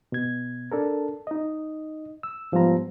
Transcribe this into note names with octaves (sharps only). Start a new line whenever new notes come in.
B2 G#6
D4 A4 A#4
D#4 D#5
E6
G#2 F3 G3 B3 F4 A#5